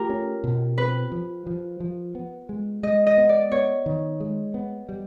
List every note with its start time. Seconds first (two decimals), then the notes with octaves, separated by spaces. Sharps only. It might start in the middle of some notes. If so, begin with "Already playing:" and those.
Already playing: A3 F4 G4 A#4
0.10 C#4
0.44 B2
0.78 C4 B4
1.12 F3
1.47 F3
1.80 F3
2.15 B3
2.49 G#3
2.83 G#3 D#5
3.07 D#5
3.18 B3
3.29 D5
3.52 B3 C#5
3.86 D#3
4.20 G#3
4.54 B3
4.89 G3